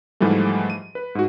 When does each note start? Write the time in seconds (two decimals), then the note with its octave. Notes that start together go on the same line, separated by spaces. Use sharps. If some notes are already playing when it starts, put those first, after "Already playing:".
0.20 G#2 E3 F3 G3 A3
0.70 D#7
0.95 B4
1.15 G#2 F#4